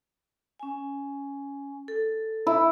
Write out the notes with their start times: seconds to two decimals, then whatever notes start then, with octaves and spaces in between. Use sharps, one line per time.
0.60 C#4 G#5
1.88 A4
2.47 E4